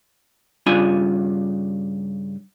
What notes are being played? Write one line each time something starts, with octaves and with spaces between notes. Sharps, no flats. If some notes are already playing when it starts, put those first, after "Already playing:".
G2 C#3 D4 F4 G#5 B5